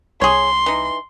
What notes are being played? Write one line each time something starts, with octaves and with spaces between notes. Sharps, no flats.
C2 G#4 C#5 C6
E3 D#4